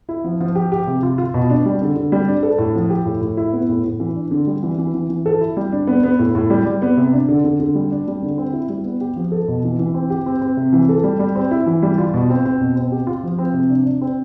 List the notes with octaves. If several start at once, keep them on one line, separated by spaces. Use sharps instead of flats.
E4
F3
F3
G4
G4
C3
F4
F4
B2
D4
G3
D3
D3
G3
D4
A4
A2
F3
G4
A2
A2
E4
B3
A2
A2
E3
D4
D3
G3
E3
E3
E3
E3
A4
E4
G3
D4
B3
B3
A2
A2
G3
G3
B3
C3
D4
D3
D3
D3
G3
D4
G3
D3
C4
E4
G3
B3
G4
F3
A4
B2
E3
E3
C4
G4
C4
C4
C3
E3
A4
G3
G3
C4
E4
E3
G3
F4
B2
C4
C4
B2
C4
G4
F4
F3
C4
C3
D4
D4
C4